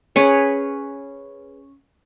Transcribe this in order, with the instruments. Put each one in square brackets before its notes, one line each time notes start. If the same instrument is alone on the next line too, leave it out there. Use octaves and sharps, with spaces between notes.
[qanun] C#4 G#4 B4 C#5